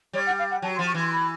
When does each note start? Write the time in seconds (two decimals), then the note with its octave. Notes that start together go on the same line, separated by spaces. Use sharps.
0.13 G3 C#5
0.26 F#5
0.38 F5
0.50 F#5
0.62 F#3 A5
0.75 C6
0.79 F3
0.86 C#6
0.94 E3 C6
1.06 C6
1.11 B5